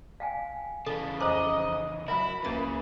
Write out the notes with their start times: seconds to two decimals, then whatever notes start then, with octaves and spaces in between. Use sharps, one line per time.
0.20 F5 G5 G#5
0.86 C#3 E3 A4 F5 A5
1.20 F2 C5 D#5 A#5 D6 D#6 F#6
2.08 F#3 E4 A#4 E5 F#5 B5
2.45 C#2 C#3 E3 A#3 A6